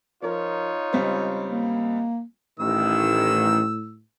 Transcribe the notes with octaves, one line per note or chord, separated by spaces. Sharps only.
F3 D#4 F4 A#4 C#5
C#2 G3 C4
A#3
A1 A2 D#3 E6